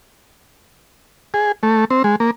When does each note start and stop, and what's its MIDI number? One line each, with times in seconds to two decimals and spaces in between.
1.34 1.52 68
1.63 1.85 57
1.90 2.03 60
2.04 2.16 56
2.20 2.31 58